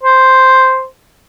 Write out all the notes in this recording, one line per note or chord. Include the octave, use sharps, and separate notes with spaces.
C5